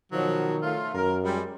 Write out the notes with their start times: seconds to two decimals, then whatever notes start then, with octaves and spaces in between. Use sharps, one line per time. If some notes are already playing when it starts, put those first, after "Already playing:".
0.12 B2 D#3 F3 F#3
0.63 A3 F4
0.94 F#2 A#4
1.23 G3 G#3